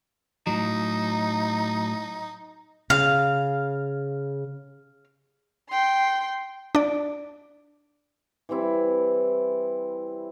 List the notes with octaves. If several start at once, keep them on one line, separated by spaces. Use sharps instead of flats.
A2 F#3 D#4
C#3 F5
G5 C6
D4 D5
E3 G3 C4 E4